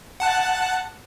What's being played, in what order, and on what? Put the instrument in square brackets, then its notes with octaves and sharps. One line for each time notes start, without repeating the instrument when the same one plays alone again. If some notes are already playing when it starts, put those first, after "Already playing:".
[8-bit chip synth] F#5 A5 F#6